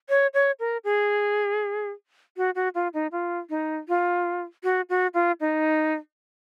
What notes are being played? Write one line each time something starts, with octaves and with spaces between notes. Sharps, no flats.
C#5
C#5
A#4
G#4
F#4
F#4
F4
D#4
F4
D#4
F4
F#4
F#4
F4
D#4